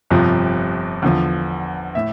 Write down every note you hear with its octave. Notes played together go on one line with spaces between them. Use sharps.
G1 F2 C3 F3
E2 D3 F3
A2 E5